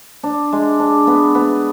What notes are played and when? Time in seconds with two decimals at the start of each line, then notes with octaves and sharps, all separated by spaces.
0.23 D4
0.52 G#3
0.80 D4
1.07 B3
1.35 B3